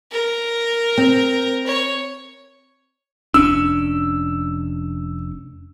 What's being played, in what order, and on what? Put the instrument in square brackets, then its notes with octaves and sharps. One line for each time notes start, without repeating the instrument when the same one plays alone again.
[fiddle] A#4
[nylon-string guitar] C4
[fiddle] C#5
[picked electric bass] F1 C#4 D4 [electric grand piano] E6